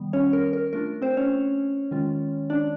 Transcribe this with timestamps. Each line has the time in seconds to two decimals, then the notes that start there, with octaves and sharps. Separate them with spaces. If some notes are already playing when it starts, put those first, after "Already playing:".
Already playing: D#3 G3 B3
0.13 C#4 C#5
0.33 A#4
0.53 A#4
0.73 A3 D4 F4 A#4
1.02 C4 C5
1.17 C#4 C#5
1.91 D#3 G#3 C#4 F4
2.50 D4 D5